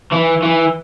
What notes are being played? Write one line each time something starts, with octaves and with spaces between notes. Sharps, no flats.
E3
E3